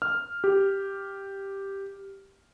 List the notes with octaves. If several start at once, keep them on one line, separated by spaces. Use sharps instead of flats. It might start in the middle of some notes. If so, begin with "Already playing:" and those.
F6
G4